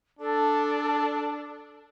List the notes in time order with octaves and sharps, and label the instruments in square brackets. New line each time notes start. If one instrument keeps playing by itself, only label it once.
[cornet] D4 [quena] A4